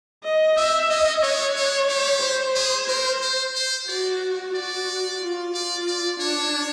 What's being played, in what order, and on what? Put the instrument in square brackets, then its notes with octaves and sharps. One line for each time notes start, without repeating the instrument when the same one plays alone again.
[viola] D#5
[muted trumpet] C4 [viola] E5
[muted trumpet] C#4 [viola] D#5
[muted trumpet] D4 [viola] C#5
[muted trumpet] D4
G4
[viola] C5
[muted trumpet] G#4
[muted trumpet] A#4 [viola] C5
[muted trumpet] C5
C5
[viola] F#4 [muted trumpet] D5
[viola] F#4 [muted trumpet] D5
[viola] F4
[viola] F4 [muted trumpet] D5
[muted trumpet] D5
[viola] D4 [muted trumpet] C#5